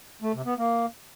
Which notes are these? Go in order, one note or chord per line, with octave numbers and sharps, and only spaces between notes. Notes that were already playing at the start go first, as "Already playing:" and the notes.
A3
C3
B3
A#3